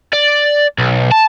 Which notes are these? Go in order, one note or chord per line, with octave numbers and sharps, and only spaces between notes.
D5
B1
A5